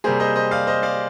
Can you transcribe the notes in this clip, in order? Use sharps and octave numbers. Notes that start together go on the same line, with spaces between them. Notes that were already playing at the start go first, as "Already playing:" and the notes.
C3 G3 A#3 G#4 C5
C5 D#5
C5 D#5
D5 F5
C5 D#5
D5 F5